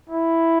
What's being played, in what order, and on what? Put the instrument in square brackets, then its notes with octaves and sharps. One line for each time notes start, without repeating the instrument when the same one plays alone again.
[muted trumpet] E4